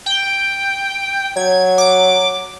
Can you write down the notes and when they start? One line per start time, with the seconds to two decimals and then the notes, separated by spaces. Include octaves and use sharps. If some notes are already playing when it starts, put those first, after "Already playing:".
0.06 G5
1.36 F#3 G#6
1.78 D6